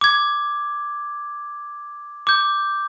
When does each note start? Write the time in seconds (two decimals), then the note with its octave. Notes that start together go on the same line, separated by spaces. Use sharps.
0.01 D6 G#6
2.27 D6 G6